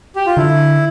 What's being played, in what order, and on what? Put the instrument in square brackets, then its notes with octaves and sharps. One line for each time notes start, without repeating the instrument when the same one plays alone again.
[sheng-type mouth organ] G4
F4
[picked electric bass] D3 [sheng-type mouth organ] E4